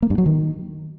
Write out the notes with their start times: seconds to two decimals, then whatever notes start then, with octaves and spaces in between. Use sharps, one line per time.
0.02 A#3
0.10 G2
0.18 F#3
0.26 D#3